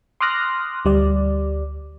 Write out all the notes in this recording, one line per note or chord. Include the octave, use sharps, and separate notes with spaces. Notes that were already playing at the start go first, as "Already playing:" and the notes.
C6 D6 D#6 F6 F#6 A#6
D2 G3 D5